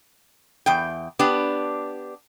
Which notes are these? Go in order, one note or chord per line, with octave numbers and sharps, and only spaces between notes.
E2 G5
B3 D4 G4